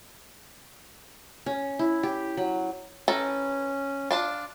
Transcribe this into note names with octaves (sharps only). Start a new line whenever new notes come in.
C#4
E4
G4
F#3
E3 C#4 A4 A#5
D4 F4 A5